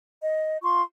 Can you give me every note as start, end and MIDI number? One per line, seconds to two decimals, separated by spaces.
0.22 0.57 75
0.62 0.81 65
0.62 0.81 84
0.62 0.81 85